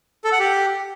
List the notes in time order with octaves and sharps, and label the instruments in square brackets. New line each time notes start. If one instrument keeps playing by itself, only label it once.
[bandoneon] A4
F#5
G4